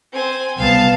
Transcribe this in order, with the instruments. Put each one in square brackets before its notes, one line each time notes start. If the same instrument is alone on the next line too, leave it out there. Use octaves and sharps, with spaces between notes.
[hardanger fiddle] C4 G#5
[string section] C2 B3 A5 [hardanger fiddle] F5